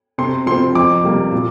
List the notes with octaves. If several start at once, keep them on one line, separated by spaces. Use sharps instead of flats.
C3 C6
F3 C4 C6
F2 D6
C3 G3 A#3
A#2